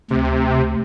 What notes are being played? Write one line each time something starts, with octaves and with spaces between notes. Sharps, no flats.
D2 C3